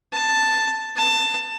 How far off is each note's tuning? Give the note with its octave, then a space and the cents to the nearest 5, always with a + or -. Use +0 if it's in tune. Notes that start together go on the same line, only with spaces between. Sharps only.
A5 +5
A5 +20